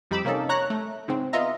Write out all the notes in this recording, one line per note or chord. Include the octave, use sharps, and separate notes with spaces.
F2 G3 D#4 B5 D6 E6
C3 A#3 C#4 D#4 A4
C#5 A#5 F#6
A3
G#2 C#3 C4
B3 F4 D#5 E5 A#5